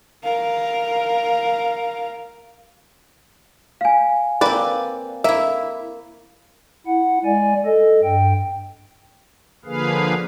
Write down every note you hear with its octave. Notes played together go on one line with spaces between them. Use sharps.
A#4 F5
F5 G#5
A#3 C4 B4 D5
A#3 E4 E5
E4 F#5
G#3 D5 G#5
A4 D#5
G2 G5
D3 F3 A#3 G#4 B4 F5